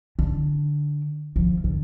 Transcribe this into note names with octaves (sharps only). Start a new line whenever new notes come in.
D3
F3
D3